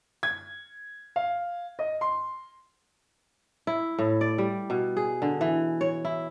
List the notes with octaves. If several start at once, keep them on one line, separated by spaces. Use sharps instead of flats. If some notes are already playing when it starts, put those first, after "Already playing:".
G#6
F5
D#5
C6
E4
A2
D5
G3
B2
G#4
D3
E3
C#5
E4